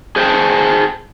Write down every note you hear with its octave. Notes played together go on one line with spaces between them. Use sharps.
G#4 C5 F#5 G5 A5